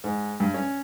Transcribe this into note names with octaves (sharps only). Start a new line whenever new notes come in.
G#2
G2
C#4